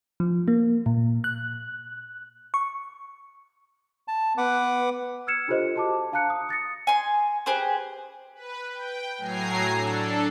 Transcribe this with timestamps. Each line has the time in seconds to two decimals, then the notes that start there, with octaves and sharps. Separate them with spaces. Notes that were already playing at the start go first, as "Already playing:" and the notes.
0.20 F3
0.48 A#3
0.86 A#2
1.24 F#6
2.54 C#6
4.08 A5
4.38 B3 B4 F#5 D6
5.27 E6 F6 G#6 C#7 E7
5.48 D4 F4 G4 A4 C5 D#5
5.76 F#4 A5 D6
6.12 D4 F5 A5 A#5 F#6 C#7
6.30 D#6
6.49 D#6 A6 A#6 C#7
6.87 G#5 C6
7.46 G4 G#4 B4 C5
8.35 B4
8.71 G5
9.18 A2 F#3 G#5 A#5 C7
9.73 D4 A4